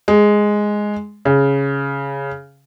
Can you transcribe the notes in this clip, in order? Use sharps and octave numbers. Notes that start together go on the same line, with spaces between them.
G#3
C#3